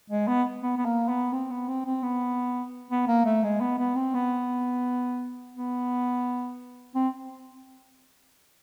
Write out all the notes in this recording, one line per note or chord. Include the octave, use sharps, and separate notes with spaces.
G#3
B3
B3
B3
A#3
B3
C4
B3
C4
C4
B3
B3
A#3
A3
G#3
B3
B3
C4
B3
B3
C4